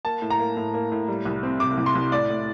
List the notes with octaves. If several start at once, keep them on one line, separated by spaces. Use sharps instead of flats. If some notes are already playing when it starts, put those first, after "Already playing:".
A#3 A5
A2
A#5
A#3
A2
A#3
A2
G3
C2
C4
C3 D6
C2
C6
C2
A2 D5
A2